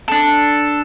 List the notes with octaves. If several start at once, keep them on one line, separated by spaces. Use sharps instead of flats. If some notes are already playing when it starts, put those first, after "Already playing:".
D4 A4